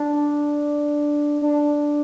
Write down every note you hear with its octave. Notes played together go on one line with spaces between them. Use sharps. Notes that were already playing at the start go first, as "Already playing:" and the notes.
Already playing: D4
D4